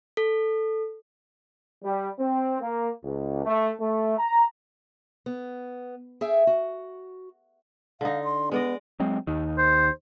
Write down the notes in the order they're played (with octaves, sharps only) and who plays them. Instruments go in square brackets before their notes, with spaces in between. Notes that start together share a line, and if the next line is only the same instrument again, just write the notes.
[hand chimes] A4
[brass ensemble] G3
C4
A#3
C#2
A3
A3
A#5
[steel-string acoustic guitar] B3
G#4 E5 G5
F#4
[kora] D3 D#4 [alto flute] F5
[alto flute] C6
[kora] G#3 D5 D#5 [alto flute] B3
[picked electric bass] F#3 G#3 C4
D#2 D#3
[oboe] C5